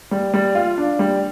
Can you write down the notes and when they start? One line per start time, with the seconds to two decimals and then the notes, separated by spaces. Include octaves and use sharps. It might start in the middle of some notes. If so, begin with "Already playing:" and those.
0.11 G3
0.34 G3
0.55 F4
0.78 D4
0.99 G3